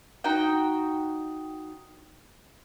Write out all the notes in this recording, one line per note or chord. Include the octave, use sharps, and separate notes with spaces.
D#4 F#4 G5